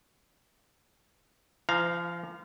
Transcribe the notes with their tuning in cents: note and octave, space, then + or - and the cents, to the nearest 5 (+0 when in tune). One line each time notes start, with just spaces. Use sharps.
F3 -35 F5 +0 A#5 +0